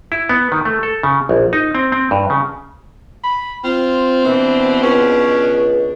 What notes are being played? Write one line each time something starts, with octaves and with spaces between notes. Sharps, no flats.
E4
B3
D#3
A3
A4
C#3
A#1
D#4
C4
C4
G2
C#3
B5
C4 F4
B2 E3 D4
C#2 C#4